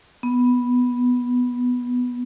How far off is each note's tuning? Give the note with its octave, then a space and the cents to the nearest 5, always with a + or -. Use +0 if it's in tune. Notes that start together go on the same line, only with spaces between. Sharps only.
B3 -5